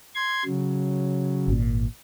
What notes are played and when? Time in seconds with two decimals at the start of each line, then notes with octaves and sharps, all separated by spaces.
0.15 C6 G#6
0.45 C#3 F#3
1.48 G#1 A#2